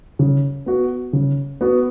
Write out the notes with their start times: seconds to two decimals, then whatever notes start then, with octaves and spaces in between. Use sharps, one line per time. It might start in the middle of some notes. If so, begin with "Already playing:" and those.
0.19 C#3
0.66 B3 F#4
1.13 C#3
1.61 B3 F#4